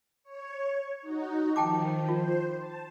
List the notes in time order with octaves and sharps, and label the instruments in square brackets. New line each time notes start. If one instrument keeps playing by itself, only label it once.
[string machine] C#5
D#4 F#4
[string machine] D#3 F3 [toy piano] G5 A5 D6
[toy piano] F4 [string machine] C5
[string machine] A5